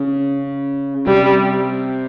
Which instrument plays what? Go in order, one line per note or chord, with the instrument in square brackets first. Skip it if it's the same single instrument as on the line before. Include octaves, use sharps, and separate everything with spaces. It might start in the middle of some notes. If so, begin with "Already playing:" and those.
Already playing: [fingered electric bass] C#3
[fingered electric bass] C3 [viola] G3